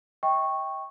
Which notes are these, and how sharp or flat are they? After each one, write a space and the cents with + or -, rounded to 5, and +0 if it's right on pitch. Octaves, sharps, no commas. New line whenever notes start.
D#5 +45 G5 +0 C#6 -10